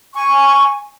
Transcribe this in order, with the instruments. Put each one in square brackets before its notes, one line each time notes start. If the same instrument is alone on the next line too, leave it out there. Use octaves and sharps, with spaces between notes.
[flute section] G#5 C#6